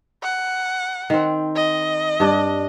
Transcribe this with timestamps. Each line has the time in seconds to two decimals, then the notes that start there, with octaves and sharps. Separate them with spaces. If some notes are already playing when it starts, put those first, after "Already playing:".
0.23 F#5
1.10 D#3 C4
1.56 D#5
2.20 G2 D4